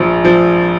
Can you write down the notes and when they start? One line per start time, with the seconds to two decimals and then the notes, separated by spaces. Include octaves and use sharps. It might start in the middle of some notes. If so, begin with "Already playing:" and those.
Already playing: A#1 F3
0.25 F3